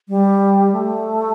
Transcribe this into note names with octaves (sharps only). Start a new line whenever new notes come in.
G3
A3